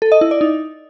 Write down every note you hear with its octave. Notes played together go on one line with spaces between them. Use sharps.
A4
D#5
E4
D5
D#4